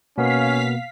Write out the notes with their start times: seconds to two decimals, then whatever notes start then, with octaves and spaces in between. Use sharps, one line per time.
0.18 B2 A#3 B3 C#4 F5 B6